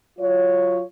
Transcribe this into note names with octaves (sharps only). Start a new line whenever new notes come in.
F#3 F4 C#5